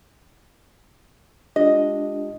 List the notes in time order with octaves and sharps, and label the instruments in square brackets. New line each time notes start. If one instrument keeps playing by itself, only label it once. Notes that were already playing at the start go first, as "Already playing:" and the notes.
[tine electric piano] G#3 F4 G4 [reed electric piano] D4 [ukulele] D#5